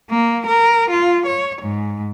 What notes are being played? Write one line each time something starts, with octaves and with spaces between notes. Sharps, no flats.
A#3
A#4
F4
C#5
G#2